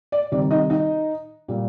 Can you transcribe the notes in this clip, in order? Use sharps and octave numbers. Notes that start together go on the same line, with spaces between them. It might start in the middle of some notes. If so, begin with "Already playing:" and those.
D5
C3 D#3 G3 D5
D#4 D#5
D#4 D#5
A#2 G3